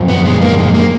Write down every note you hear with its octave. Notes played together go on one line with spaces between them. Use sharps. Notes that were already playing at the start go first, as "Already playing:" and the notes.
Already playing: F#2 F3
B3
G#3
A#3
G#3
A#3